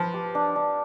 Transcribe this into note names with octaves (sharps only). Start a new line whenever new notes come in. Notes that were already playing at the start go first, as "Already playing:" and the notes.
Already playing: F3 B4
G4
D4
D4